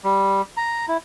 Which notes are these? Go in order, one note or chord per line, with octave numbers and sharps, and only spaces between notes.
G3
A#5
E4